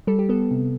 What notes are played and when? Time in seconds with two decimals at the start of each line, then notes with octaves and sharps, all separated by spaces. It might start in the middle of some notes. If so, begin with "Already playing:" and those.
0.07 G3 A4
0.19 G4
0.29 B3 A4
0.51 C3